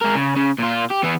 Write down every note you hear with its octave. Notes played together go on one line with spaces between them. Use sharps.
G#3 A#4
C#3
C#3
A#2 F4
G4
E3 B3